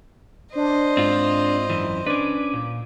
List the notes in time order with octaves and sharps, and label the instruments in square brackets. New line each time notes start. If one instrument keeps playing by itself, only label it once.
[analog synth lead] D4 [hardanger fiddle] C5 D#5
[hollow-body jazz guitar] G#2 [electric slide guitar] C4 F4
[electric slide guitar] F#2 E3
[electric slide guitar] C#4 B4 [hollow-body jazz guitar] D4 [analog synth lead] D6
[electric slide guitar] A#2